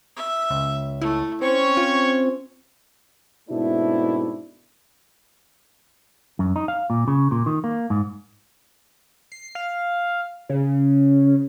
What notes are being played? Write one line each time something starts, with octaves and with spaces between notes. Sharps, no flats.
E5
C#2
A3 E4
C4 C#4 C#5 C#6
F4
G#2 B2 A3 C4 D4 E4
F#2
D#4
F5
A#2
C#3
A#2
D#3
A#3
G#2
C7
F5
C#3